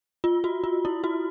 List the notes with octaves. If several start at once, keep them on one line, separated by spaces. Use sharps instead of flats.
F4
F#4
F4
E4
F#4